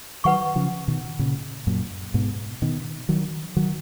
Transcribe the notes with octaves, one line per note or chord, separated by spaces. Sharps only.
D#3 F#3 B4 F#5 C#6
C#3 F3
B2 D#3
A#2 C#3
F#2 A#2
G#2 B2
B2 D#3
D#3 F#3
D#3 F#3